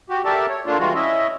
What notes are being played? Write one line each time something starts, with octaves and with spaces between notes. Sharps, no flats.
F#4 G4
G4 A4 A#4 D5 E5 A5
C#5
D3 A3 A#3 D4 F4
E3 G3 G#3 F4 F#4
C#4 E4 D#5 E5